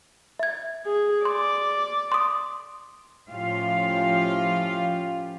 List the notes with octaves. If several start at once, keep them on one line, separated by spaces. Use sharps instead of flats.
E5 G#6
G#4
D5 C6
C6 D#6
A2 F3 C#4 F4 G4 F5